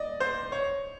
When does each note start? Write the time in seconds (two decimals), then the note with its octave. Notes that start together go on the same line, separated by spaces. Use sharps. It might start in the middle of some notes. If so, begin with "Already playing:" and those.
Already playing: D5 D#5
0.20 C5
0.52 C#5